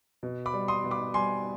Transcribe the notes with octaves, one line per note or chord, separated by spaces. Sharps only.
B2
B5 D6
G3
C6 D#6
B2
B5 D6
G3 G#5 C6